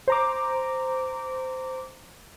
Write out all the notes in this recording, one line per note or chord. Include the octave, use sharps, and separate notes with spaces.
C5 A#5 D6